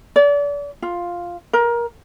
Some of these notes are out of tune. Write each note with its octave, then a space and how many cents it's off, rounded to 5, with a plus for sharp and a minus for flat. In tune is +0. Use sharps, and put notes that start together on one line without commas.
D5 -35
F4 +0
A#4 +20